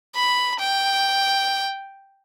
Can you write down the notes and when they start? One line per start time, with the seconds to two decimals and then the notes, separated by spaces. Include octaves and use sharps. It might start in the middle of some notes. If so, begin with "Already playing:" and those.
0.16 B5
0.60 G5